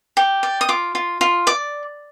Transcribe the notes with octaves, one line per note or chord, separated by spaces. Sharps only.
G4
D5
D#6
F4 D6
F4
F4
D5 D6